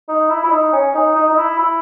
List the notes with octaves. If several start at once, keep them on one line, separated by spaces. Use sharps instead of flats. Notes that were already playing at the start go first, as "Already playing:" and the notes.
D#4
E4
E4
D#4
C#4
D#4
D#4
D#4
E4
E4